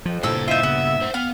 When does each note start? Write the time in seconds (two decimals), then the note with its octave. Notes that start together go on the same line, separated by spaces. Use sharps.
0.06 F2 F3
0.23 G2 A#2 C#3 E4 A4 C5 E6
0.48 D#4 F4 E5
0.63 C#3 B3
1.02 C5 F#5
1.14 B3 F5 F#5